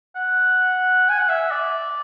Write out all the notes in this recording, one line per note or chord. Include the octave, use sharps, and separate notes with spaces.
F#5
G#5
F#5
E5
D5